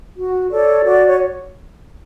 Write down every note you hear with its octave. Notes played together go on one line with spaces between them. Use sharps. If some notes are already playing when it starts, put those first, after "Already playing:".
F#4
A4 C#5 D5
F#4 D5
C#5